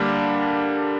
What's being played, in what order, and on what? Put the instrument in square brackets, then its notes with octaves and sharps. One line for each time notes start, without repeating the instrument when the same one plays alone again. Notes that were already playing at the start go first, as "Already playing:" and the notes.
Already playing: [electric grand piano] D3 G3 A#3 D4